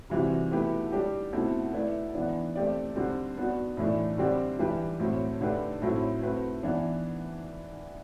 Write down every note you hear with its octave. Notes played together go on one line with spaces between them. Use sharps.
C3 E3 G3 C4 F#4
B2 A3 E4 G4 B4
G3 D4 G4
B2 A3 C4 E4 A4
A3 E4 B4 D5
E3 B3 D4
A3 C4 G4 D5
D3 G3 C4
B3 D4 F#4
A2 E3 A3 D4
D3 G3 C4 G4 D5
E3 G3 D4 G4 B4
A2 F#3 A3 C4
D3 A3 D4 G4 B4
A2 F#3 C4 E4 A4
A3 C4 F#4 B4
E3 B3 D4